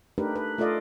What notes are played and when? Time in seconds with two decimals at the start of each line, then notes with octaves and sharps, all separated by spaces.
0.18 A3 D4 D#4 G4 A#4 B4
0.36 B4
0.58 A3 F4 A4 D5 D#5 F5